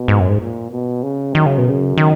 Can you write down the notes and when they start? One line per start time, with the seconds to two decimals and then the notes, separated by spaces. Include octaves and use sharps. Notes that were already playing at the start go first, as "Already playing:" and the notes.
Already playing: B2
0.08 G#2
0.20 F#2
0.29 G#2
0.40 A#2
0.72 B2
1.03 C#3
1.34 F#2 D#3
1.46 C#3
1.58 B2
1.66 F#2 C#3
1.98 D#3